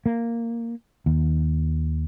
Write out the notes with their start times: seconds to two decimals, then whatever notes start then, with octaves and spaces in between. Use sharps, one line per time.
0.06 A#3
1.06 D#2